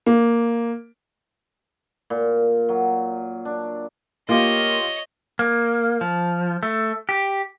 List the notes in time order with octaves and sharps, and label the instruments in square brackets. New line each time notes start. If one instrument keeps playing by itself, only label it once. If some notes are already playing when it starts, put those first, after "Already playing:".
[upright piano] A#3
[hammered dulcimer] A#2
F#3
D4
[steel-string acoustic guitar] A#3 [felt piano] F4 G4 F5 [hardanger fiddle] C#5 D#5
[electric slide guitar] A#3
F3
A3
G4